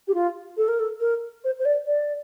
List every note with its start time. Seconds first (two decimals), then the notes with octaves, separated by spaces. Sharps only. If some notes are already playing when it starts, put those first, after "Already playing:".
0.08 G4
0.14 F4
0.57 A4
0.68 A#4
0.80 A4
1.01 A#4
1.44 C5
1.59 C5
1.65 D5
1.87 D5